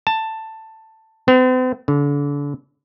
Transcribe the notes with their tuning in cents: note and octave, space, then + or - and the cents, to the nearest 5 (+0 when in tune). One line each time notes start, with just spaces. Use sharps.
A5 +10
C4 -45
D3 -35